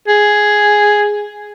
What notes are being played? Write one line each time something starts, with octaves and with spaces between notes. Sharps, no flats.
G#4